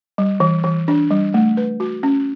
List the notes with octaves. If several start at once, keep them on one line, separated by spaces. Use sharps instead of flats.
G3
E3
E3
D4
G3
A3
B4
F#4
C#4